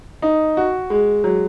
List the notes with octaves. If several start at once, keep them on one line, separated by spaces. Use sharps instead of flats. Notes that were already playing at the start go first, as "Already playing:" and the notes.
D#4
F#4
G#3
F#3